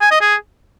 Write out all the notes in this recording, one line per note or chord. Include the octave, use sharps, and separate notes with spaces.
G#5
D#5
G#4